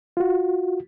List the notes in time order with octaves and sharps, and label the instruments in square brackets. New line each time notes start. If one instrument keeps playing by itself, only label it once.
[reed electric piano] F4 F#4